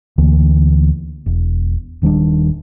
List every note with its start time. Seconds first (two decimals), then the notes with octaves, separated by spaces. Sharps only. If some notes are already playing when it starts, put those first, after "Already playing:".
0.18 D2 D3 E3 A#3
1.26 E1
2.02 D#1 D#3 G3 D4